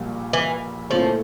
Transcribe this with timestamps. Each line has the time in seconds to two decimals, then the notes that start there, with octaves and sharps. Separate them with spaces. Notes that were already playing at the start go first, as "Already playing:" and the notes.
Already playing: A#1 A#2 G3
0.33 E3
0.90 A#2 F3 A3 E4 A4 C#5